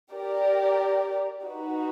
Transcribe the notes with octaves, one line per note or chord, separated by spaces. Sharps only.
G4 A#4 D5
D#4 F#4 B4